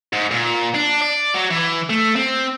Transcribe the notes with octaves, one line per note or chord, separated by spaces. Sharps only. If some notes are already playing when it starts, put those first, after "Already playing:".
G#2
A#2
D4
D5
F#3
E3
A3
C4